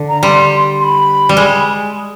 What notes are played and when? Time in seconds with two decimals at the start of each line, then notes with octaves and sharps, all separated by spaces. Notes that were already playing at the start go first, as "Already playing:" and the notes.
Already playing: D3
0.09 A#5
0.23 G3 C6
0.80 C6
0.84 B5
1.29 G3
1.37 G#3